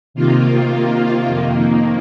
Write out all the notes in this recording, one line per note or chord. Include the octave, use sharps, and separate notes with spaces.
C3 D#3 A#3 F4
F2 D#3 A#3